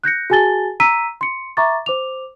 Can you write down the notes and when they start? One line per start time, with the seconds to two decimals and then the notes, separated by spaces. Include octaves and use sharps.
0.04 F#6 G6 A#6 C#7
0.30 F#4 G#4 G#5 A5 A6 G7
0.80 A#5 E6 B6 D#7
1.21 C6 C#7
1.57 E5 A#5 C#6 D6 A6
1.86 C5 D6 F7